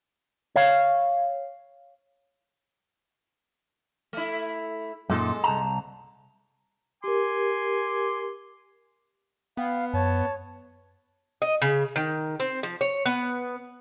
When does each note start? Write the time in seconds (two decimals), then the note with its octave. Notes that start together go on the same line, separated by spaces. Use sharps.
0.56 C#5 F5
4.13 A3 E4
5.10 F#2 A#2 G#3 D#4 A4
5.44 C2 A5 A#5
7.04 G4 A#4 G#5 C6 D6
9.57 B3 F5 G5
9.94 F#2 C#5 A5
11.42 D#5
11.62 C#3
11.96 D#3
12.40 C4
12.63 F3
12.81 C#5
13.06 B3